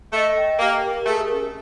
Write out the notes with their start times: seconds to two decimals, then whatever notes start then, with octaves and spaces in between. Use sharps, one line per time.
0.13 A3 D#5
0.37 G5
0.59 A#3 G4
0.83 A#4
1.06 A3 G#4
1.30 C#4